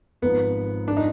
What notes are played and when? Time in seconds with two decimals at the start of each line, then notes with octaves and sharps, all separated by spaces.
0.22 G#1 G#2 F3 B3
0.88 D4
0.97 D#4